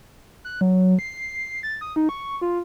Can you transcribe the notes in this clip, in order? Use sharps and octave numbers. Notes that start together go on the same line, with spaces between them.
F#6
F#3
C7
A6
D#6
D#4
C#6
F4